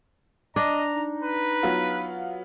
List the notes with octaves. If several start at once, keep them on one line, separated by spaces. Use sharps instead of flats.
D4 D#5 A#5
D#4
B4
F#3 B3 F4